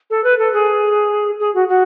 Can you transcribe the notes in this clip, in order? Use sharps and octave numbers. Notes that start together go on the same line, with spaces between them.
A4
B4
A4
G#4
G#4
F#4
F#4